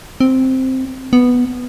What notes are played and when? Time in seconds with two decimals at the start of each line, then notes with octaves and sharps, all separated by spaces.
0.20 C4
1.13 B3